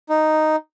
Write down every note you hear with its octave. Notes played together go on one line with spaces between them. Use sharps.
D#4